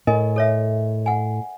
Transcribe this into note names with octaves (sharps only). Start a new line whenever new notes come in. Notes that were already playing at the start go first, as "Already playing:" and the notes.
A2 A#4 D#5 G#5
A4 C#5 E5
F#5 G#5